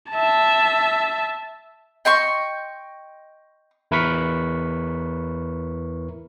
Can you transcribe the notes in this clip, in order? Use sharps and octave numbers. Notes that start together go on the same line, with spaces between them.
E5 A5
D#5 G5 C6 C#6
E2 E4 A#4 B4 C#6 B6